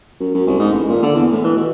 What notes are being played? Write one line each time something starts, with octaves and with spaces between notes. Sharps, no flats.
F#2
F#2
C2
G#2
A1
A#2
D3
E2
A2
E3
B2